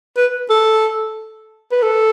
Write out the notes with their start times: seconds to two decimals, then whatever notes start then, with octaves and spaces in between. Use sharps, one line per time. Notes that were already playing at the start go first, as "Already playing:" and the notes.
0.16 B4
0.50 A4
1.72 B4
1.82 A4